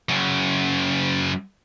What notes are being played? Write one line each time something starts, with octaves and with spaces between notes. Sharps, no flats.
F#2 C#3